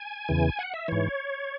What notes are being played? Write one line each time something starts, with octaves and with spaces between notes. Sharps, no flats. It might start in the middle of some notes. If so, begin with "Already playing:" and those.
Already playing: G#5
E2 C#3 E3
F#5
E5
G#2 E3 C#5